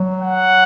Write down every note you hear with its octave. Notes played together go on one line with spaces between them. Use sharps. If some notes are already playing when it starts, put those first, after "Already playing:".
Already playing: F#3
F#5